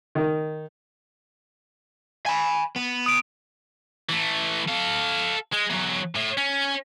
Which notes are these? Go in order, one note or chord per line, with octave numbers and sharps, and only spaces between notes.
D#3
G#5 B5
B3
D#6 D7
E3 A3
A4 F5
G#3
E2 F#3
A2
C#4